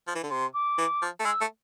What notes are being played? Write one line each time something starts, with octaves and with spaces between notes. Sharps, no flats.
F3
E3
D3
C3 C6
D6
E3
F3
A3
G#3 E6
A3